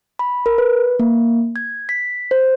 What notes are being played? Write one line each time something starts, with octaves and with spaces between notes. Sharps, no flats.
B5
A#4
B4
A#3
G#6
B6
C5